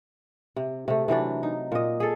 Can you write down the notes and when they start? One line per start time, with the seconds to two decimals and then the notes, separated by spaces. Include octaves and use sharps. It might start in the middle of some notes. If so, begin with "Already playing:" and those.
0.56 C3
0.88 C3 A3
1.08 C3 E3 F#3 D4
1.43 D#4
1.72 A#2 D#5
2.00 G#4 A4